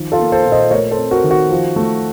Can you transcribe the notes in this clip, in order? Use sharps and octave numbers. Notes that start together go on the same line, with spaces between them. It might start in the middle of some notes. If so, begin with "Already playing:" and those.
Already playing: D#3 F3
F4 A4
A#3
A4 C5
A#2
C5 D#5
A3 A#4 C#5
A4 C5
C4
F#4 A#4
D#3
F#4
F3
A3